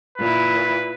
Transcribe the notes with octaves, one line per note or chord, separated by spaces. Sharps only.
A#2 E4 B4